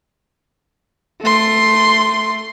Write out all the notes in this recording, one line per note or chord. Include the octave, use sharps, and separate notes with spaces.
A3 C6